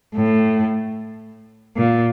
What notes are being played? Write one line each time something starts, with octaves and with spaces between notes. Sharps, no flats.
A2
A#2